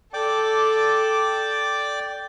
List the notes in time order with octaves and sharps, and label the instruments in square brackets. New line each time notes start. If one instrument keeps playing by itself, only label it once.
[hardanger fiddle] A4 [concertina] D5 G5 D6